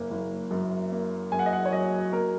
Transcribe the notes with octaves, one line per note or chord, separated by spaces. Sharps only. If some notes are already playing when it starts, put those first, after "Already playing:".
Already playing: F#1 A#3
F#1
F#2
A#3
F#2 G#5
F#5
D#5
F#5
C#5
F#3 D#5
A#3 A#4